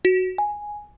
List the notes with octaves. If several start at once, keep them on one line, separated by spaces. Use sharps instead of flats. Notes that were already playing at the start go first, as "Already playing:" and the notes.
F#4
G#5